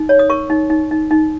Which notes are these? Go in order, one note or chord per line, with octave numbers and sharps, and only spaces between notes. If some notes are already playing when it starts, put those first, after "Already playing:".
Already playing: D#4
C#5
D#6
A#4 C#6
D#4
D#4
D#4
D#4